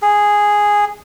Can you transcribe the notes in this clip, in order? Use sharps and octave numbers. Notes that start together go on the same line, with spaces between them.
G#4